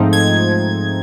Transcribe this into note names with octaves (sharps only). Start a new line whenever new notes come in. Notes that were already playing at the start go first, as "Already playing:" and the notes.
Already playing: G#2 F3 A3 C4 D#4
G#6